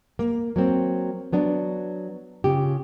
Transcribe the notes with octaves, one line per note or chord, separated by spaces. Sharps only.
A#3
F#3 A#3 C4
F#3 B3 D4
C#3 F4 G4